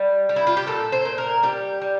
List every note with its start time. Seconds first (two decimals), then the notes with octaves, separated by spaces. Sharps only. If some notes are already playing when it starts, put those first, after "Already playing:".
Already playing: G3
0.29 G3
0.36 E4
0.47 F4
0.57 G4
0.67 A#2 A4
0.92 C5
1.05 A#2
1.18 A#4
1.43 G3 G4
1.81 G3